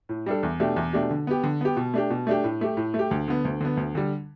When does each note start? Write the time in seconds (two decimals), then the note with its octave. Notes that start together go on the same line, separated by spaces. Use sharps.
0.09 A2
0.26 G3 D4 A4
0.43 E2
0.60 B2 A3 D4 G4
0.76 E2
0.93 B2 A3 D4 G4
1.11 D3
1.27 B3 G4
1.44 D3
1.61 B3 G4
1.77 B2
1.94 A3 D4 G4
2.10 B2
2.27 A3 D4 G4
2.44 A2
2.61 A3 G4
2.77 A2
2.94 A3
2.99 G4
3.11 D2
3.28 D3 B3
3.45 D2
3.61 D3 B3
3.77 D2
3.95 D3 G3